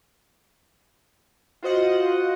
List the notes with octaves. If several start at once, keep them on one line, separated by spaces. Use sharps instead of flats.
F4 F#4 C5 D#5 F#5